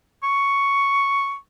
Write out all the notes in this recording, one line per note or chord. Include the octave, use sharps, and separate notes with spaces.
C#6